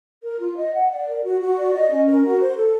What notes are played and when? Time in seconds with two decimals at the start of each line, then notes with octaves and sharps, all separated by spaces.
0.23 A#4
0.40 F4
0.57 D#5
0.74 F#5
0.91 D5
1.06 A#4
1.24 F#4
1.40 F#4
1.57 D5
1.74 D#5
1.91 C#4
2.07 A#4
2.24 F#4
2.41 C5
2.57 A4